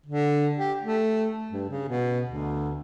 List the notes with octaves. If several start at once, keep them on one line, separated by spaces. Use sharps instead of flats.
D3
G4
A3
G2
C#3
B2
D2